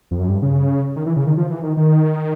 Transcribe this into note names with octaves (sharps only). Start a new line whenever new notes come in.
F2
F#2
G2
C#3
D#3
E3
C#3
D#3
F3
E3
D#3
D#3